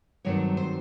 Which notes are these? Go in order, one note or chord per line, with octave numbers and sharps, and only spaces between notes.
G2 D#3 F#3 A3 C4 C#5
C5